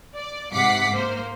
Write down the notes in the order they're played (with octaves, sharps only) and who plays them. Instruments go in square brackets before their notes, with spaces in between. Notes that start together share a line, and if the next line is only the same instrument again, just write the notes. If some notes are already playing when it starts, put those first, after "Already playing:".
[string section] D5
G#2 C3 F#5 D6 B6 C7
A#3 C5